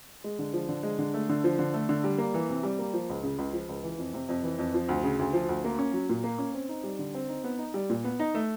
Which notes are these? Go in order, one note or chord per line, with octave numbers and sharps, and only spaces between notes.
G#3
D3
F3
D3
G#3
D3
A3
D3
F3
D3
A3
D3
G3
A#3
E3
C3
G3
A#3
F3
C#2
C#3
C#2
F3
C#2
E3
F2
C3
F2
E3
F2
F3
D2
C#3
D2
F3
D2
A#3
C#4
F#3
A#2
A#3
C#4
C4
D#4
G3
D3
C4
D#4
B3
D#4
G3
A#2
B3
D#4
A3